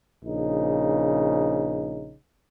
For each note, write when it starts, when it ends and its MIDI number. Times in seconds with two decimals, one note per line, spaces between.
0.23 2.16 34
0.23 2.16 49
0.23 2.16 63